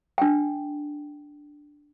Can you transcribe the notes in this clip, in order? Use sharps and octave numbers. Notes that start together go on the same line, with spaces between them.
D4 G5